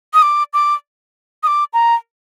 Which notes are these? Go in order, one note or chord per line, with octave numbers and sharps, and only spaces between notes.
D#6
D6
D6
D#6
D6
A#5